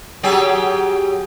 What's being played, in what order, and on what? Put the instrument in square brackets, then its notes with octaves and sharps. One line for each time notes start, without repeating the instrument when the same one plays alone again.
[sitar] F#3 G4 G#4